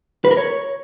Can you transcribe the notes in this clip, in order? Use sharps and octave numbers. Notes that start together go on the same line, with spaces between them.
B4
A#4
C#5